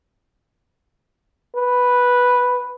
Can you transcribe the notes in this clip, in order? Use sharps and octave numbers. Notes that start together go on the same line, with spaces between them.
B4